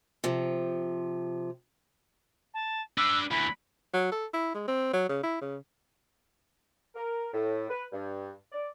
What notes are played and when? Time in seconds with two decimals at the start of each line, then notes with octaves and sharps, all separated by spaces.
0.24 C3 F3
2.54 A5
2.98 D4 B4 E6
3.31 D2 E3 B5
3.93 F#3
4.12 A4
4.34 E4
4.55 G#3
4.68 C4
4.93 F#3
5.09 C#3
5.23 E4
5.41 C#3
6.95 A#4
7.33 A2
7.69 B4
7.92 G2
8.52 D5